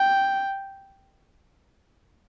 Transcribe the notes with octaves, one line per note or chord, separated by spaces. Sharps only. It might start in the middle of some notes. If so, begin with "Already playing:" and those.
Already playing: G5